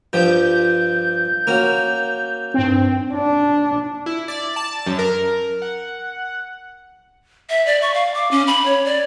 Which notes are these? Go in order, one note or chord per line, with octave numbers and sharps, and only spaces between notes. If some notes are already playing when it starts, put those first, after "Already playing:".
G2 F3 G4 G6
A#3 C#4 F#4
G2 C4
D4
E4
D5
A5
F#2
A#4
F#5
E5
D5
C#6
F5
D6
C#4
B5
C#5
D5